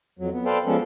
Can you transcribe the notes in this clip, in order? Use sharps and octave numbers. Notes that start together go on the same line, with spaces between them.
F2 F#3
B3
A4 B4 C5 D5 F5 G5
F3 G#3 B3 C#4 A4